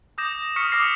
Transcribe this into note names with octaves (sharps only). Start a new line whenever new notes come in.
D6 D#6 G6 A#6 E7
C#6 D#6 F6 B6 C#7
D6 D#6 F6 A#6 C7